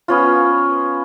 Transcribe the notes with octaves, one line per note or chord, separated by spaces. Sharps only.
B3 C#4 F4